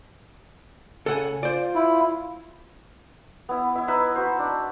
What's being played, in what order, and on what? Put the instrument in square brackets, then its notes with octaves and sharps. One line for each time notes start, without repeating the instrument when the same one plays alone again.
[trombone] C#3 [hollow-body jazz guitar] A4 F#5 G#5
[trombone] F4 [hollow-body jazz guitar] C5 D5
[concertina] E4
[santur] B3 E4
E4 E5
D#4 E4 B4 E5
F#4 C5
D4